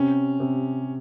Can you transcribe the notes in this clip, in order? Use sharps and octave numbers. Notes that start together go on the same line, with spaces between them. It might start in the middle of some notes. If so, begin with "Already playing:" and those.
Already playing: C3 C#4
C3